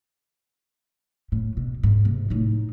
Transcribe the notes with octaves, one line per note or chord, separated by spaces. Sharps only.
A2
B2
G#2
C3
A2 D#4